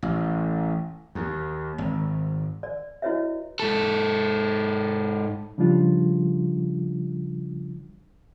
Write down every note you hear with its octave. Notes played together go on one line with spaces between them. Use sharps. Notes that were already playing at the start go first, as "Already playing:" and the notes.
A1
D#2
G#1
D5
E4 F#4 B4 C#5 D#5 E5
G#2 A4
C#3 F3 G3 D4 F4